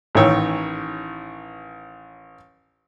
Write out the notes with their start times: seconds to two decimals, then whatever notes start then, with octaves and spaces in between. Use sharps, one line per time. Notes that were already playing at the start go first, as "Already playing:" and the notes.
0.15 A1 D#3 E3 C#5 G5 E6